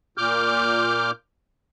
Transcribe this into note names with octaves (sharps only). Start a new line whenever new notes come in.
A#2 D6 F6 G6